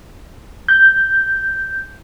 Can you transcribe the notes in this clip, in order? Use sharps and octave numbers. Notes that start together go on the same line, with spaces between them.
G6